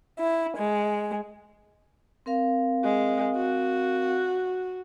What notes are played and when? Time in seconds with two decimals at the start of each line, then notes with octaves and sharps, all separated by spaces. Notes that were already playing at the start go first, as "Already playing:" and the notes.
0.19 E4
0.57 G#3
2.26 C4 A#4 F5
2.84 G#3
3.36 F#4